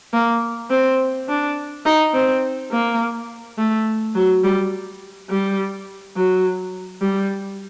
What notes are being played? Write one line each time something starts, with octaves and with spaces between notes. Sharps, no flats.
A#3
C4
D4
D#4
C4
A#3
A3
F#3
G3
G3
F#3
G3